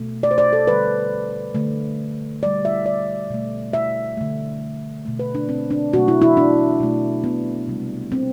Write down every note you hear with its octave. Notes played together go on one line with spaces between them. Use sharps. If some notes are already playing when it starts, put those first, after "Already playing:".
Already playing: B2 A3
D5
C5
D5
A4
D3 G3 B4
D3 A3
B2 G3 D5
E5
D5
B2 A3
E5
D3 A3
B2 A3
B4
D4
C4
D4
B2 F#3 A3 F#4
E4
E4
D4
B2 A3
B3
C3 G3
C4